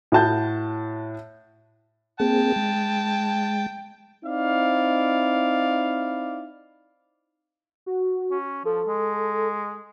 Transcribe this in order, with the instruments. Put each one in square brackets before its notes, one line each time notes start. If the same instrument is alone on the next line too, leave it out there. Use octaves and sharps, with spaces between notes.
[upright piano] A2 F#4 A5 G6
[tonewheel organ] A#3 C4 G#4 [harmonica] G5 A5
[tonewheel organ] G#3 A6
[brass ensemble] C4 D#4 E4 D5 F5
[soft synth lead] F#4
[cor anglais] C#4
[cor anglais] F3 [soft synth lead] A4
[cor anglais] G#3